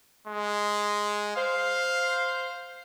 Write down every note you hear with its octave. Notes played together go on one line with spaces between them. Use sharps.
G#3
C5 F5